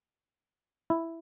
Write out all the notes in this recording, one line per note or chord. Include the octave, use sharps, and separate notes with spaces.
E4